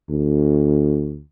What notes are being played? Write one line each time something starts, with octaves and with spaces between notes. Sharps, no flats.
D2